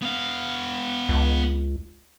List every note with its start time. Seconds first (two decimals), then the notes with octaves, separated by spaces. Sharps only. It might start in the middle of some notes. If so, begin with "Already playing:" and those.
0.02 B3 F5
1.09 C#2